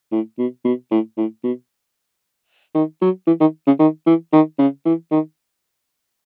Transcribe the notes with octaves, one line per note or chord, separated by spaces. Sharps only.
A2
B2
B2
A2
A2
B2
D#3
F#3
E3
D#3
C#3
D#3
E3
D#3
C#3
E3
D#3